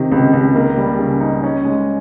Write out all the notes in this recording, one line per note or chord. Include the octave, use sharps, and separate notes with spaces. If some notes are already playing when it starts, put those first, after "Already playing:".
Already playing: C3 D#3
C#2
C#2
A#3
G3
C#3
D#4
C#4
G#3